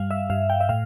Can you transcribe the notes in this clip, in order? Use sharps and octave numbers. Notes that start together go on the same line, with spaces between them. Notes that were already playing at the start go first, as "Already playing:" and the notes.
Already playing: G2 G3 F5
E5
G2 F5
G5
E5
A2 F5